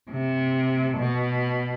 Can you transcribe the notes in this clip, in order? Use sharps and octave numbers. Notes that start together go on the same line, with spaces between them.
C3
B2